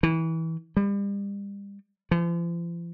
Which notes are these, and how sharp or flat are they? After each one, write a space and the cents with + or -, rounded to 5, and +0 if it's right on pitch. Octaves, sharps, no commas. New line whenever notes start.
E3 -25
G3 +35
F3 -40